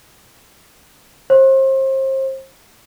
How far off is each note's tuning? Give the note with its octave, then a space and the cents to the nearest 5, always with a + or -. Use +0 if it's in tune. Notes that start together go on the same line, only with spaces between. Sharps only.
C5 +35